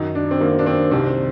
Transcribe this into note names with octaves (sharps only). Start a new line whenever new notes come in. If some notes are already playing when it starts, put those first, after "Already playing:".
Already playing: F#2 D#3 D#4
D4
C4
F#2 D#3 A#3
D4
C4
C2 C3 D#3 C4